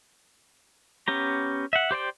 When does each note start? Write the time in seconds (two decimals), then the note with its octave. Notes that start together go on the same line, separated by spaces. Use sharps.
1.08 B3 C#4 G4 A#5
1.73 E5 F#5
1.91 G4 C5 D5 G5